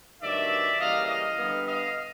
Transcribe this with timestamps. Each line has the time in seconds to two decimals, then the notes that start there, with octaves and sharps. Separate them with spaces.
0.21 G2 D#3 F#3 A3 D5 E5
0.79 C#3 E3 G3 A#3 D#5 F5
1.07 D#5 F5
1.36 D3 G3 B3
1.65 D#5 F5